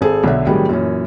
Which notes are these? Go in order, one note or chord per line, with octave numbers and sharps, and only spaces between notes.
G#1 G#4 A4 C5
B1 D3 E5
A2 C3 D#3 F#3 G3 G#4
F#2 A#2 E3 C#4